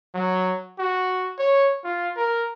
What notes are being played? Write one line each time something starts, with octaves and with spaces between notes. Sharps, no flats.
F#3
F#4
C#5
F4
A#4